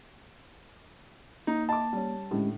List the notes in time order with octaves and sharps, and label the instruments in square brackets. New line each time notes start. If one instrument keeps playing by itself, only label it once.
[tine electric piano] A#3 [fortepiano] D#4
[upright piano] D#5 C6 D6 [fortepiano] A5
[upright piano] G3 C#4
[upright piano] A2 D3 [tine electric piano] G#3 C#4 G4